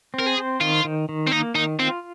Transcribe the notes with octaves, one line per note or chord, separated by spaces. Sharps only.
C4
A#4
G#4
C5
D#3 F4
D#3
D#3
C4
A#3 D#4
D#3 D#4
C4 F4